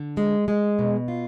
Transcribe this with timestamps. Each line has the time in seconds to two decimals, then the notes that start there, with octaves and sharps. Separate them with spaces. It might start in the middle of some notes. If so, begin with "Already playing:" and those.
Already playing: D3
0.17 G#3
0.48 G#3
0.79 B2
1.08 F4